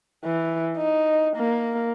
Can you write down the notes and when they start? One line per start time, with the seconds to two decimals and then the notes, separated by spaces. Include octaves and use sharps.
0.24 E3
0.77 D#4
1.36 A#3